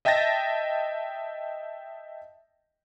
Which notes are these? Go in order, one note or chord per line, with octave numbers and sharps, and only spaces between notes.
D#5 E5 G5 A5 A6 A#6